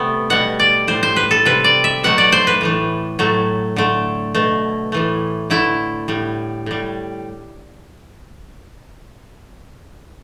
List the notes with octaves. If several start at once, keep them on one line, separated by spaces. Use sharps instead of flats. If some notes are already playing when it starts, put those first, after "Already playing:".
Already playing: C3 G3 A3 B3
B2 G3 F#5
D5
A2 G3 C5
C5
B4
A4
C3 G3 B4
D5
E5
B2 F#3 A3 F#5
D5
C5
B4
A2 E3 A3
A2 F#3 A3
D3 A3
B2 A3
A2 E3 A3
D3 A3 E4
A2 G3
A2 G3